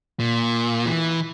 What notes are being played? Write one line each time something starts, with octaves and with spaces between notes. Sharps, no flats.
A#2
E3